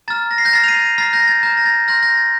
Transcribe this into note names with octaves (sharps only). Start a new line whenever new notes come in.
A#5 F6 A6
A#6
C7
G6 A#6
A#5 F6 A6 C7
F7
C7 D#7
A#5 F6 A6 C7
G6 A#6
A6
A#5 F6 G6
A#6
A6
C6 F6 G6 A#6
G6 A#6
A6